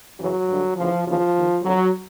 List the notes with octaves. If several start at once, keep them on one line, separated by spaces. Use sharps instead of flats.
F#2 C#3 E3 F#3
G2 D3
D2 C#3 E3 F3
D#2 C#3 E3 F3
D#2 D#3
F2 D3 F#3